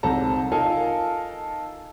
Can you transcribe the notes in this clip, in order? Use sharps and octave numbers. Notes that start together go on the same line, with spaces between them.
C2 G#2 C3 A4 A5 A#5
D#4 F4 A4 A#4 F5 G#5